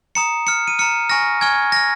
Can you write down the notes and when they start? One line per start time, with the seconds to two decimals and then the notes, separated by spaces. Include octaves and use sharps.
0.15 A#5 D#6 C#7
0.47 A#5 F6 C#7
0.68 D#7
0.79 A#5 F6 C#7
1.09 G#5 C#6 F6 A#6
1.41 G#5 C#6 F6 G#6
1.72 G#5 F6 A#6